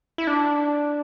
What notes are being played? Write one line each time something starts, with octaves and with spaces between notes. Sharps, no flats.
E4
D4